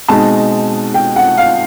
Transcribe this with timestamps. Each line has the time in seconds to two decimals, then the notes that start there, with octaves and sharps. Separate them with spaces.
0.08 B2 G#3 C4 D#4 A5
0.94 G5
1.16 F#5
1.37 F5